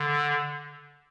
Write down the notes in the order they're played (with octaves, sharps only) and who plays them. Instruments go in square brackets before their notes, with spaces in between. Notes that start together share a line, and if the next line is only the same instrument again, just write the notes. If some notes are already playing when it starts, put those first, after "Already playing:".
Already playing: [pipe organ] D3